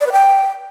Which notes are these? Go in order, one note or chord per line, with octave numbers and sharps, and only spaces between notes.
D5
B4
G5